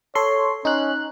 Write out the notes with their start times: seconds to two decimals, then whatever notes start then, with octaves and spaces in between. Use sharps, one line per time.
0.15 A4 C#5 C6
0.65 C#4 D#4 F#6